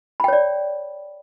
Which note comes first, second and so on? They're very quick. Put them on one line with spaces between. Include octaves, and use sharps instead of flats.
B5 G5 C#5 D5